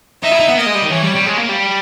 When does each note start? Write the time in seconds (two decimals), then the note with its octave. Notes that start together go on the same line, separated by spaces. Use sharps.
0.23 D#4 E5
0.31 E4
0.40 D#4
0.48 B3
0.57 A#3 D#5
0.66 G#3
0.75 G3
0.83 D#3
0.91 E3 C#5
1.02 G3
1.15 G3
1.26 G#3
1.37 A#3
1.49 G3